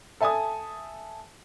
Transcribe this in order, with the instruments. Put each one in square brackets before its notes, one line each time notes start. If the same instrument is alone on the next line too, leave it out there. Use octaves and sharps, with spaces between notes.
[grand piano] A4 E5 G#5 A5 D#6